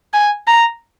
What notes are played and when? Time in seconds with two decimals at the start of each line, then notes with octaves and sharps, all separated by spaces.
0.14 G#5
0.47 A#5